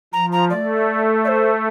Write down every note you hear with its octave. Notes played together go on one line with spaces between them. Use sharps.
F3 A#5
A#5
A3 D5
D5
C5